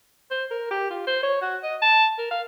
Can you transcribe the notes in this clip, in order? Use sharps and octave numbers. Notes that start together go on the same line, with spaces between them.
C5
A#4
G4
F4
C5
C#5
F#4
D#5
A5
A#4
F5